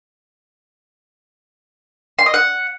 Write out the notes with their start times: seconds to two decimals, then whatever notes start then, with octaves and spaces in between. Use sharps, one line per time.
2.19 C6
2.26 D#5
2.34 F#5